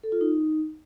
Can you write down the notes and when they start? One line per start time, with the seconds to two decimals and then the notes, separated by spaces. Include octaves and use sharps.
0.03 A4
0.12 F4
0.21 D#4